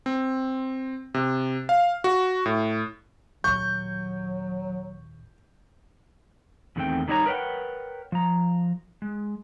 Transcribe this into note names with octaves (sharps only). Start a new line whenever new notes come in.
C4
C3
F5
F#4
A2
D#2 A#2 F#3 C#6 G6
E2 A#2 D#3 A3 C4 G5
D#3 G3 D#4 E4 C#5 A#5
A#4 B4 C#5 F#5 G5
F3 A#5
G#3